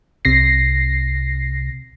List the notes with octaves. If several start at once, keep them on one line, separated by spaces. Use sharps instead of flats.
C2 C3 A#6 C7